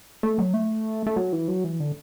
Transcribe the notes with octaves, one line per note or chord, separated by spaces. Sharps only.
A3
F#3
A3
A3
F#3
E3
F#3
E3
D3